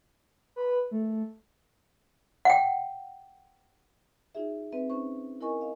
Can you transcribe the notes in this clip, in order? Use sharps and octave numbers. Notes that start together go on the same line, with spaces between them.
B4
A3
F#5 G5
D#4 F4 F#4 G#4 E5
C4 B4 E5
C#4 D#4 C5 C#6
E4 A#4 D#5 G#5 C#6
D#5 F5